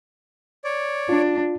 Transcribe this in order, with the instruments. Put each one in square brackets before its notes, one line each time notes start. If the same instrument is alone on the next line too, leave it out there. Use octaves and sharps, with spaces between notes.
[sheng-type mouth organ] C#5 D5
[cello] D4 [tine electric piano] F4